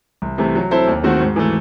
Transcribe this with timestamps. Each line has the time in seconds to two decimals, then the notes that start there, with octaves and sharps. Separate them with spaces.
0.22 C2
0.38 C3 E3 A3
0.55 F#3
0.71 C4 E4 A4 C5
0.88 D#2
1.03 D#3 A3 C4 F#4
1.21 G#2
1.36 E3 A3